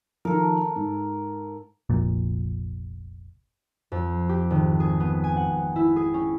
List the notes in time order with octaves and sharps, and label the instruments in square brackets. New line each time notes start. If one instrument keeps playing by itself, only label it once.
[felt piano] D#3 F3 [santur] A4 A#4
[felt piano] G#2
[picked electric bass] F1 A#1 A#2
[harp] F2
G4
G#1
G#4
B3
G#5
F#5
E4
G#4
C#4